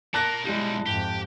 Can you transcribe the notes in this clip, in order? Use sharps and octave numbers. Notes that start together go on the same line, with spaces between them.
A#4 D5 A5 F#6 A#6
B1 G3 G#3 E4
F2 G#2 G4